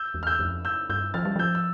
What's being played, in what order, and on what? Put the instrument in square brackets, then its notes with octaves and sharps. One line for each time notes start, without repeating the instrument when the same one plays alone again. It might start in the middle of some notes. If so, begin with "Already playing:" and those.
Already playing: [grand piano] E6 G6
[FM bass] E2
[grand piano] F6
E6 G6
[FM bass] F2
[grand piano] E6 G6
[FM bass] G2 [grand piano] E6 G6
[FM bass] F3 [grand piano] F6 A6
[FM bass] G3
[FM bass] F3 [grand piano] E6 G6
[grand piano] E6